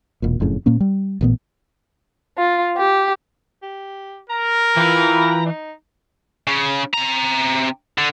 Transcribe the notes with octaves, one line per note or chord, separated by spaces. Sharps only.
E1 A#2
F#1 F2 A2 C#3
A#2 A#3 C#4
G3
A1 A#2 B3
F4
G4
G4
A#4 A#5
E3 F4 B4 G5 B5
D#4
C#3
C3 A#5
D3